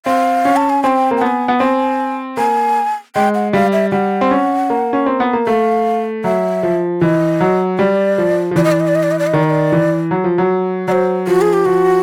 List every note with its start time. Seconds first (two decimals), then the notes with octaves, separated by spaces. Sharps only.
0.06 C4 F5
0.45 C#4
0.56 A5
0.70 G#5
0.83 C4 G5 G#5
1.11 A#3
1.17 G5
1.21 B3 A5
1.27 G#5
1.48 B3
1.60 C4 G#5
2.37 A#3 G#5
3.15 G#3 G5
3.35 F#5
3.53 G3 F5
3.73 E5
3.92 G3 F#5
4.21 C4
4.31 C#4
4.70 A#3
4.93 C#4
5.06 C4
5.20 B3
5.33 A#3
5.47 A3 F5
6.24 F#3 E5
6.63 F3
7.01 E3 D#5
7.40 F#3
7.79 G3 D5
8.18 F3
8.51 F3
8.56 E3 D5
8.64 D#5
8.72 D5
8.80 D#5
8.88 D5
8.95 D#5
9.03 D5
9.11 D#5
9.19 D5
9.27 D#5
9.33 D#3 D5
9.43 D#5
9.50 D5
9.72 E3
10.11 F#3
10.24 F3
10.38 F#3
10.88 F#3 C5 D5
11.27 F3 F#4
11.41 G#4
11.53 G4
11.65 F3 F#4